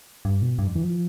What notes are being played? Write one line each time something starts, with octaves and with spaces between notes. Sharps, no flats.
G2
B2
G2
F2
E3
F3